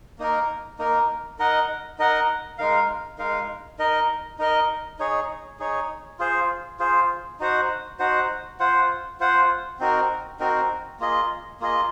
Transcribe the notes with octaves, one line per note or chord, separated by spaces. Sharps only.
A#3 D#4 A#4
A#3 D#4 A#4
D#4 A#4 D#5 F#5
D#4 A#4 D#5 F#5
G#3 D#4 A#4 F5
G#3 D#4 A#4 F5
D#4 A#4 D#5
D#4 A#4 D#5
D#4 G#4 C#5
D#4 G#4 C#5
F4 G#4 C5
F4 G#4 C5
D#4 F#4 C5 F#5
D#4 F#4 C5 F#5
F4 C5 F#5
F4 C5 F#5
C4 D#4 F#4 A#4
C4 D#4 F#4 A#4
A#3 F4 G#4 D#5
A#3 F4 G#4 D#5